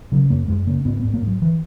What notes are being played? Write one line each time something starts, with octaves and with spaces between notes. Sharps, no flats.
C#3 F#3
F#2 A#3
F#2 G#3
C#3 A#3
G#2 B3
G#2 B3
A#3
G#2
F#3
E3